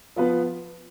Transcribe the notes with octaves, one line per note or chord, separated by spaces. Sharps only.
F3 B3 F4 B4